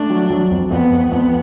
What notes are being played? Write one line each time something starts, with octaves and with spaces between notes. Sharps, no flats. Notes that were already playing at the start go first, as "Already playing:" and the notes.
Already playing: A3 D4
F#3
F#3
F2
F2 B3
F2
F2 B3